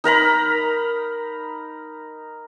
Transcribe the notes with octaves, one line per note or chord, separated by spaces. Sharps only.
D#4 A#4 A#5 B5